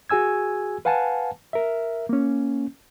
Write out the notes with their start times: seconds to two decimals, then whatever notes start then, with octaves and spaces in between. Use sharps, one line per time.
0.09 F#4 G#4 G#5 E6 G#6
0.85 B4 F5 F#5 G#5 A5
1.53 A#4 E5
2.09 A#3 C#4